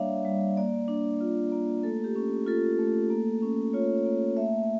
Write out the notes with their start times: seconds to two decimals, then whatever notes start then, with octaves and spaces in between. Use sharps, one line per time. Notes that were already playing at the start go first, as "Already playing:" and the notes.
Already playing: G3 A#3 D4 C#5 D5 E5 F5
0.25 G3
0.57 A#3 D5
0.88 D4
1.21 F4
1.52 A#3
1.83 A3 A4
2.04 G4
2.16 C#4
2.47 F4 A4
2.79 A3
3.10 A#3
3.42 C#4
3.73 F4 C#5
4.05 A#3
4.37 A3 E5